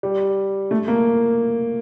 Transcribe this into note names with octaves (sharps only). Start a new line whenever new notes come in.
G3
A3
A#3